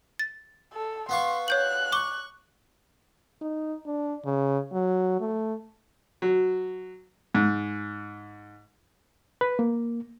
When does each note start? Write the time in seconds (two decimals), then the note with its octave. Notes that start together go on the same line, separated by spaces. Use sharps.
0.19 A6
0.73 A4
1.09 B3 F5 C6 C#6
1.48 C#5 F#6 G6 F#7
1.92 C#6 D6 G7
3.42 D#4
3.86 D4
4.25 C#3
4.73 F#3
5.20 A3
6.22 F#3
7.35 G#2
9.41 B4
9.59 A#3